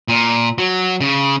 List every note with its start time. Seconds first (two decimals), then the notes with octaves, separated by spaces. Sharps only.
0.08 A#2
0.58 F#3
1.01 C#3